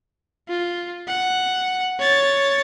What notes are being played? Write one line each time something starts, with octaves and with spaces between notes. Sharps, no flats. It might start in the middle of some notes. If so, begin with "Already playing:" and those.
F4
F#5
C#5 A6